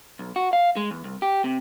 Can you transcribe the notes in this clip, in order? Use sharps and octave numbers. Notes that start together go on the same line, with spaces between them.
B1
F#4
F5
G#3
E2
C2
G4
C3